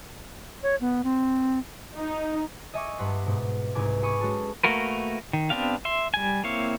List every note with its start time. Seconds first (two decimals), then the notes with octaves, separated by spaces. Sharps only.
0.63 C#5
0.81 B3
1.04 C4
1.97 D#4
2.74 D#5 E5 G#5 C#6 D6
2.98 G2 F#5 C6 B6
3.26 G#2 B2
3.75 C2 G#2 B4 G#5 D6
4.03 G#5 B5 C#6 D#6
4.21 G#3 C#4 F#4 G#4 A4
4.63 A3 A#3 F#4 A#4 B4
5.33 D#3
5.50 B3 C4 D4 G4 F5
5.85 E5 C6
6.14 G3 G#5
6.44 A#3 C4 E4 C#5 F5